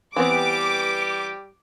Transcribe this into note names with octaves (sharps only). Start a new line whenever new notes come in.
E3 G3 B3 C4 G4 D6